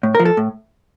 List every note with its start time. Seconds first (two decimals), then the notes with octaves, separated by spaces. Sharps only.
0.03 A2
0.15 F3 A#4
0.25 A4
0.37 A2